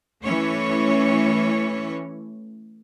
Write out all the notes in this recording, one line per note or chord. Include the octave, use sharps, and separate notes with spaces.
E3 A3 C#4 C#5